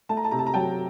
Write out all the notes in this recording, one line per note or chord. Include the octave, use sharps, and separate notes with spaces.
A3 A5
A#5
A5
C3 A#5
A5
A#5
F#3 G5 A5